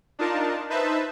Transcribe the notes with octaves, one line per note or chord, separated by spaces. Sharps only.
D4 D#4 F4 A#4 A5
D#4 B4 C5 E5 A5